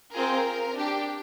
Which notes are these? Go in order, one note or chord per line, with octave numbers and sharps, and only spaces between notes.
C4 F4 G#4 A#4
D4 G4